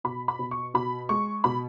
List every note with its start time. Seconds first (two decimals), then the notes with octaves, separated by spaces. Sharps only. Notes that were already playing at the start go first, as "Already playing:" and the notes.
0.04 B2 B5
0.28 B5
0.39 B2
0.51 C#6
0.74 B2 B5
1.09 G#3 C#6
1.44 B2 B5